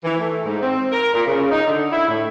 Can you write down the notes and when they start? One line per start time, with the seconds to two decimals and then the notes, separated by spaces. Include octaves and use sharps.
0.04 E3
0.20 A3
0.45 G#2
0.62 C4
0.92 A#4
1.14 A#2
1.27 C#3
1.51 D#4
1.67 D3
1.92 E4
2.09 A2